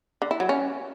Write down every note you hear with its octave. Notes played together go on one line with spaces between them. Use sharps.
D3
E4
F#3
C#4